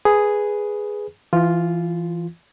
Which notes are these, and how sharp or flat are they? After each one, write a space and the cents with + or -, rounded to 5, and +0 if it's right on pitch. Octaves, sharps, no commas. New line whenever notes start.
G#4 +0 B4 +0
E3 +25 F4 +0